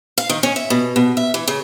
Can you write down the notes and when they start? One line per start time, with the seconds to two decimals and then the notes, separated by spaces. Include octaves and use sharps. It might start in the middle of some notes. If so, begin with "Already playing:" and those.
0.18 F5
0.29 D#3
0.43 C#4
0.56 E5
0.70 B2
0.96 B2
1.17 E5
1.34 E3
1.47 C#3